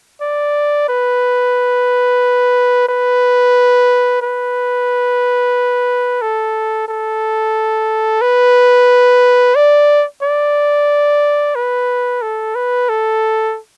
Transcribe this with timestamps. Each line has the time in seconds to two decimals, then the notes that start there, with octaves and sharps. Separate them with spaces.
0.21 D5
0.88 B4
2.89 B4
4.22 B4
6.22 A4
6.88 A4
8.22 B4
9.55 D5
10.22 D5
11.55 B4
12.22 A4
12.55 B4
12.89 A4